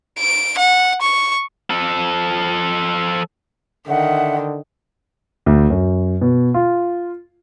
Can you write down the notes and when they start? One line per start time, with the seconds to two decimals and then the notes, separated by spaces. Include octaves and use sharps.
0.19 D7
0.58 F#5
1.02 C#6
1.70 F3 A4
3.88 D3 D#3 E5 F#5
5.46 D2
5.70 F#2
6.21 B2
6.54 F4